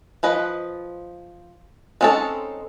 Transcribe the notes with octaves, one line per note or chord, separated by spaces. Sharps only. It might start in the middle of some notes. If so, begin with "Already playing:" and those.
F3 B4 D#5
G#3 C4 C#4 D#4 A4